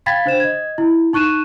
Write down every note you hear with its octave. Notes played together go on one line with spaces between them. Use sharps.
F5 G5 B5 G#6 A6 B6
D4 C5 E7
D#5 G#6
E4
D#4 C#6 F#6 D#7 E7